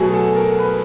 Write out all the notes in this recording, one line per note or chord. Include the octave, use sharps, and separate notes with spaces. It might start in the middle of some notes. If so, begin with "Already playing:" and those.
Already playing: B2 F#3 A3 G#4
A4
A#4
B4